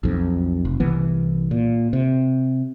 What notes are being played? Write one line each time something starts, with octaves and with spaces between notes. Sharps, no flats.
B1 F2
F1
C2 E3 B3
A#2
C3